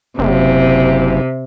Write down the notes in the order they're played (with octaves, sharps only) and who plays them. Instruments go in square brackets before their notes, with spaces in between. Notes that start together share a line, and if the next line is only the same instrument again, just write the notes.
[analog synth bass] F#1 [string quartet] C3